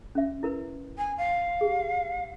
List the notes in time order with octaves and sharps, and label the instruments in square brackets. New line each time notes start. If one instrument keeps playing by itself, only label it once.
[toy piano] C#4 E5
E4 A#4 B4
[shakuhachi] G#5
F5
[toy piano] G4 G#4